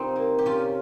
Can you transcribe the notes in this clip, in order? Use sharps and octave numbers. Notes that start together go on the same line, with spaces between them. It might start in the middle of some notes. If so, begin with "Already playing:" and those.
Already playing: C3 G3 C4 D#4 F4
A#3
G4
C3 C#4 F4